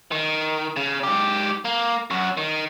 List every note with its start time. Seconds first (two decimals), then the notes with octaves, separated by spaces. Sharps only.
0.12 D#3
0.76 C#3
1.04 G#2 G4
1.65 A#3
2.11 F#2 F#4
2.37 D#3